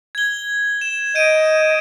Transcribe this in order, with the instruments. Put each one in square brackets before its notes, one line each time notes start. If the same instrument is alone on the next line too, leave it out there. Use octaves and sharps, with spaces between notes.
[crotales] G#6 G7
E7
[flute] D#5 [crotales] G6 D7 D#7